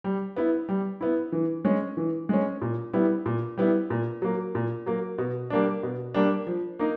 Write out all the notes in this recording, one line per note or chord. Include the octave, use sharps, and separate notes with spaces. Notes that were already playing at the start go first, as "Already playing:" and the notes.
G3
B3 E4
G3
B3 E4
E3
G#3 C#4
E3
G#3 C#4
A#2
G3 B3 E4
A#2
G3 B3 E4
A#2
F#3 A#3
A#2
F#3 A#3
B2
G3 A#3 D4
B2
G3 A#3 D4
F3
A#3 D#4